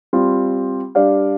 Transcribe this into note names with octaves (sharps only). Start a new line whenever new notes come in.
G3 C4 F4
G3 D4 G4 D5 F5